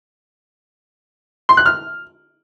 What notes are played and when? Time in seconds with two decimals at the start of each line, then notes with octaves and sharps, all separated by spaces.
1.49 C6
1.57 F#6
1.66 F6